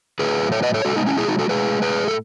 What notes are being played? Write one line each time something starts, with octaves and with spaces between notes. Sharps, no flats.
A2 F#3 G#4 B4
A4 C#5
B4 D#5
A4 C#5
B2 G#3 F#4 A4
B3 D#4
C#4 E4
E4 G#4
D#4 F#4
F#4 A4
A2 G#3 G#4 B4
G#4 B4
A4